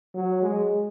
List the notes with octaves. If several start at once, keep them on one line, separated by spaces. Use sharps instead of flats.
F#3
G#3